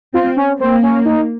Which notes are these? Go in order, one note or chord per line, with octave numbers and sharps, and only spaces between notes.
C4 F4
C#4
A#3 C4
C#4
D#4